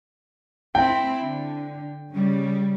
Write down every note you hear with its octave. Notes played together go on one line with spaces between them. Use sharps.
C4 E4 G5
D3
C#3 G3